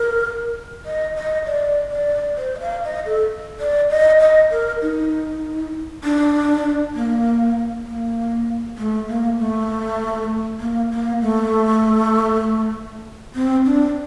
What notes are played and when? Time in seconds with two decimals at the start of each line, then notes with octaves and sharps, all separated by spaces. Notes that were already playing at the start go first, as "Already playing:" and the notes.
Already playing: A#4
0.86 D#5
1.16 D#5
1.46 D5
1.92 D5
2.38 C5
2.56 D#5
2.60 F5
2.84 D#5
3.06 A4
3.60 D5
3.90 D#5
4.20 D#5
4.51 A#4
4.82 D#4
6.04 D4
6.95 A#3
7.86 A#3
8.78 A3
9.08 A#3
9.38 A3
10.60 A#3
10.91 A#3
11.21 A3
13.35 C4
13.66 D4